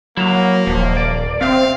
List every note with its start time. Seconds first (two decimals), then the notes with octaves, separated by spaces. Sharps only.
0.17 F#3 A#3 E4 A#5
0.67 D#1 F3
0.97 D5
1.41 C3 C4 F5